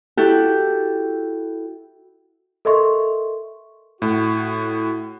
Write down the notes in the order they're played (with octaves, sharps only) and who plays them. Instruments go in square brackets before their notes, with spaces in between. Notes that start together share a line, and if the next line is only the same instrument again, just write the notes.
[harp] E4 F#4 G4 A4 G5
[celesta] A4 A#4 D#5 E5 C6 C#6
[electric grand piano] A2 [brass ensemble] F#4